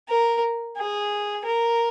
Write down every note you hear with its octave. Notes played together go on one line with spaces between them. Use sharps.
A#4
G#4
A#4